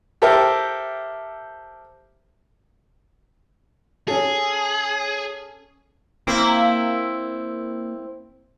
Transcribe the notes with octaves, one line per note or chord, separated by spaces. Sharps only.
G4 A4 A#4 C5 E5 G5
C#4 G#4 A4
A#3 C4 E4